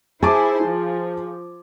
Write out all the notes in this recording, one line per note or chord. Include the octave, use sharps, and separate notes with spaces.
E4 G#4 C5 G#5 A5 D6
F3